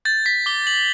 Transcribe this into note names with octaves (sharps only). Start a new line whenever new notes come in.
G6 A6
B6
D6 G7
F#7